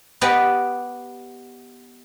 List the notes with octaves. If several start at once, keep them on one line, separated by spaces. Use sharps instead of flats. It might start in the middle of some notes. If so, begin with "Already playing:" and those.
B3 G4 B4 D5 D#5